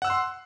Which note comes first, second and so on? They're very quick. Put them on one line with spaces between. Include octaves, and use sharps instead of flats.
F#5 E6 F#6 C6